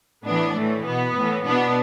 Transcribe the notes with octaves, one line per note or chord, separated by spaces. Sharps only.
A2 E3 B3 D4
A2 E3 A3
B2 B3
A2 E3
B2 B3 D4